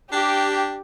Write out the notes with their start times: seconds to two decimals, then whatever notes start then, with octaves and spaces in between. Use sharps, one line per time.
0.12 D4 G4